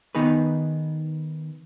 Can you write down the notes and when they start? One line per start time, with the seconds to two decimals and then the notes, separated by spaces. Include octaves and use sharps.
0.15 D#3 B3 D#4 G#4 B4